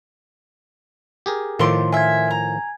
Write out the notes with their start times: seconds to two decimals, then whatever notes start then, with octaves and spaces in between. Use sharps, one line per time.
1.26 G4 G#4 A#4
1.59 A2 D#3 F3 A4 C6 D6
1.93 F4 E5 G#5 G#6
2.31 A#5